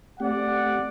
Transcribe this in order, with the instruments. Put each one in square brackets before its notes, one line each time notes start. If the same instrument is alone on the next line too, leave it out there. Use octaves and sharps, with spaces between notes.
[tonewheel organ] A3 C4 G4 [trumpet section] D5 F#5